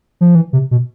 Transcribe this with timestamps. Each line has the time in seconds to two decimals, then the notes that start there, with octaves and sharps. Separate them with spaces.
0.21 F3
0.35 E3
0.53 C3
0.71 B2